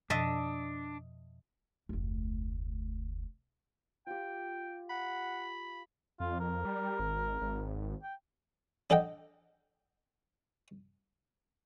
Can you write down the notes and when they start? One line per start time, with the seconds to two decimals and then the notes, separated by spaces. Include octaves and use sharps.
0.10 F2 B2 F3 D4 D#5 E5 A5
1.89 F1 D2
4.07 F4 G4 G5
4.90 F#5 B5
6.20 F2 F4
6.40 A#4
6.65 G3
7.00 G#1
7.41 G#1
8.03 G5
8.90 D4 A4 D#5 F#5 G5